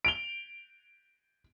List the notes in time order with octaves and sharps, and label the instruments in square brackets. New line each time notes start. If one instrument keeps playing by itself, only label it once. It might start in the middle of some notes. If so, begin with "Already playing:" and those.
[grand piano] D7 F7 G7